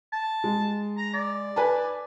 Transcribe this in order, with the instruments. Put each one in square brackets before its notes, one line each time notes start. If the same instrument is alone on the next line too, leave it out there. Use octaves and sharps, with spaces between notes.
[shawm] A5
[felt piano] G#3
[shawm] A#5
D5
[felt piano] B4 G#5 A5